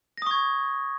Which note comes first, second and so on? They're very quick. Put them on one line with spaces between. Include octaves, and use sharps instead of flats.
A#6 D#6 C#6 G#6